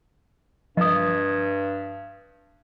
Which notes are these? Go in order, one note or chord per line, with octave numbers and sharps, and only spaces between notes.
G2 F3 D#5 D#6